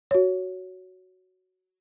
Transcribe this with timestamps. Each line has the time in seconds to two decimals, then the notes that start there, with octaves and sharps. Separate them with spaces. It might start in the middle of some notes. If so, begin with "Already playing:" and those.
0.11 F#4 C#5